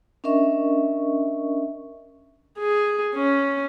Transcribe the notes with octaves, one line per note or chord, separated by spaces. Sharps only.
C#4 D4 A#4 D#5 E5 C#6
G#4
C#4